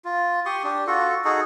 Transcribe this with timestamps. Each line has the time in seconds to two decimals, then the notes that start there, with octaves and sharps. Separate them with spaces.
0.05 F4
0.46 G4 C6 C#6 D#6
0.64 D4 G4
0.87 F4 F#4 A4
1.25 D#4 F#4 G#4 A4